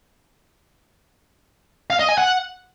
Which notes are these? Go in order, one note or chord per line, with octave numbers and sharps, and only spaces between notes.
F5
D#5
G#5
F#5